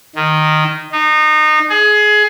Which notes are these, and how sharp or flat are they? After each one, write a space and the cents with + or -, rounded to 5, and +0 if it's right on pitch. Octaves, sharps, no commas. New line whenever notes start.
D#3 -10
D#4 -25
G#4 +20